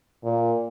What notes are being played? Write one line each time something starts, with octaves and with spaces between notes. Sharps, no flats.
A#2